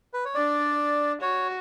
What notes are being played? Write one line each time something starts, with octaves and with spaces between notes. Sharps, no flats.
B4
C#5
D4 D5
F#4 C#5